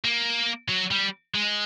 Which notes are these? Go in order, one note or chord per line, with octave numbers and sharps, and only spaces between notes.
A#3
F#3
G3
G#3